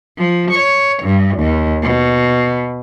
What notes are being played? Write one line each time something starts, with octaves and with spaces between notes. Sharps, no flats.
F3
C#5
G2
D#2
B2